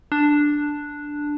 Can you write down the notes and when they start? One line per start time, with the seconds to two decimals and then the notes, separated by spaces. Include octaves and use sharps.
0.12 D4